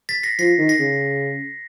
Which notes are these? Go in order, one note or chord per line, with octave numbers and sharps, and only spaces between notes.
A6 B6
A#6 C7
F3 A#6 C7
D#3
A#6 C7
C#3